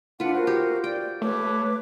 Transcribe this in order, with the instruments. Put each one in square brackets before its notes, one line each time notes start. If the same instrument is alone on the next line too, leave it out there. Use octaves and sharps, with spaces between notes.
[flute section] D4 F#5 [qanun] F4 B4
[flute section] F#4 A#4 C5
[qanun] G4
[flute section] D5 [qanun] G5
[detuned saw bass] A3 [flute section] B4 C#5 D6